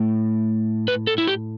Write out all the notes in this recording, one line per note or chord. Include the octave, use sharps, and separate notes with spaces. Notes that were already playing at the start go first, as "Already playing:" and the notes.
Already playing: A2 A3
B4
A4
E4
G4